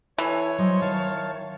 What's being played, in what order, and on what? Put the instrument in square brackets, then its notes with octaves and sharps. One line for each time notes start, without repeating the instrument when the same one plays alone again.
[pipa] E3 [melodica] A4 G#5 [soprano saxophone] C#5
[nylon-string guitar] F#3 [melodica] C5 D#5
[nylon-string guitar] D#3 [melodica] F5 A5